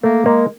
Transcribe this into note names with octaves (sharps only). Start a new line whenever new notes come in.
A3 A#3
G#3 A#3